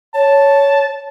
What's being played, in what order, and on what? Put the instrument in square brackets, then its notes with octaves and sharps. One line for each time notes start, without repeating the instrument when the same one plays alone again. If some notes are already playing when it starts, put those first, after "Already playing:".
[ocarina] C#5 [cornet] A5